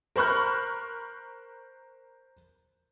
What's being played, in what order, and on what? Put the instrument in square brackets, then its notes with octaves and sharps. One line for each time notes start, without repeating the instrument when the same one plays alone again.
[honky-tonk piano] A#4 C5 B5 C#6 F6 F#6